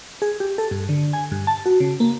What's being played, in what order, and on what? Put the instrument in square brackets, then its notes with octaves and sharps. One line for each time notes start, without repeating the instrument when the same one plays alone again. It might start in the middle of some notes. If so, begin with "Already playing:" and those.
[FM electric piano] G#4
G4
A4
G2
D3
G#5
G2
A5
F#4
C#3
A#3